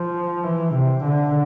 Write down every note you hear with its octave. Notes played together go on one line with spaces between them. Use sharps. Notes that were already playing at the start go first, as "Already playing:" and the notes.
Already playing: F3
E3
C3
D3